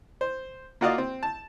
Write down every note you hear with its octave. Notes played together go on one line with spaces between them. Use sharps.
C5
A#3 F4 F#4 D5 D#5 F5
C4
A5